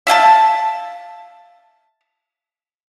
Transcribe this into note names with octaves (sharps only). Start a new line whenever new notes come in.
E5 F5 G5 A5